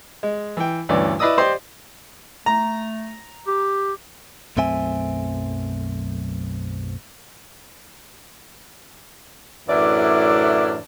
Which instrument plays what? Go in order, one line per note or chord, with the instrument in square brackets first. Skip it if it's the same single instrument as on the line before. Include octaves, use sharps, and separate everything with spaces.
[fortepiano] G#3
E3 G5
D2 G2 E3 C#4 D5
E4 B4 D5 D#5 D#6 E6
G4 C5 D5 D#5 C6
[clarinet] A3 [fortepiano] A#5
[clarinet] G4
[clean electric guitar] B1 F#2 A3 C4 E5 G#5
[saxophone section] F#2 A2 E3 D4 E4 D5